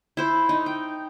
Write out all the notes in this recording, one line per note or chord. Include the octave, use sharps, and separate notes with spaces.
E4 C5
D#4
G5